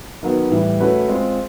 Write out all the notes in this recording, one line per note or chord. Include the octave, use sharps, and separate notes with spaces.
D#3 F#3 B3
A2 E3 G3
A3 C#4 F#4 B4
G#3 C4 F4